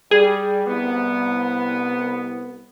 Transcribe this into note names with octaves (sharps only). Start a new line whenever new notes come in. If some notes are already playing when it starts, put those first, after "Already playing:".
G3 G#4
C2 B3